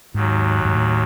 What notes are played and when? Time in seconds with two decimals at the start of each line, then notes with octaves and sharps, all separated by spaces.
0.14 D#2 G#2 D#3 F#3
0.65 G#2
0.73 A2